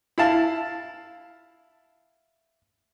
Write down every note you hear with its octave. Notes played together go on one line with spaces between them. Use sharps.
E4 F5 A5